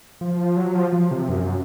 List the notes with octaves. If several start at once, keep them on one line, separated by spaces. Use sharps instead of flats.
F3
F#3
F3
F3
C3
F#2